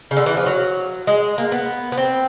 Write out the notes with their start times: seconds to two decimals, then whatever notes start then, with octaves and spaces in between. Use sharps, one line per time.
0.11 C#3
0.17 D3
0.26 E3
0.37 F3
0.46 F#3
1.07 G#3
1.38 A#3
1.52 B3
1.92 B3
1.98 C4